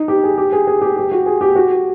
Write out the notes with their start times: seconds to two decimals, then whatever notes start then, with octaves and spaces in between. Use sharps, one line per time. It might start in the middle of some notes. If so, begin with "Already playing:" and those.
Already playing: D#4
0.08 G4
0.23 G#4
0.38 G4
0.52 G#4
0.67 G#4
0.81 G4
0.97 G4
1.12 F#4
1.26 G#4
1.41 G4
1.55 F#4